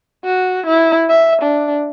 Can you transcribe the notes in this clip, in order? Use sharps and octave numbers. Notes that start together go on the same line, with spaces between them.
F#4
E4
E5
D4